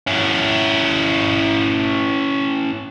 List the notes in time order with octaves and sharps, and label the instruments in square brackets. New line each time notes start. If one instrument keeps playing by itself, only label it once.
[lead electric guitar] C#4 E4